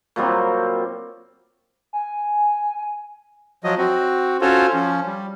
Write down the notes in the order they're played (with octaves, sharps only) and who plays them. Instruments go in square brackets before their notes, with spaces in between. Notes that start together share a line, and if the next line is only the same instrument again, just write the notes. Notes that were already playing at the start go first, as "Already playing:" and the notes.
[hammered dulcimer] A#2 F#3 G3 C4
[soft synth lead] G#5
[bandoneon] F3 F#3 D#5
C4 F#4
C#4 F4 F#4 A4 C5 C#5
F3 C#4
G3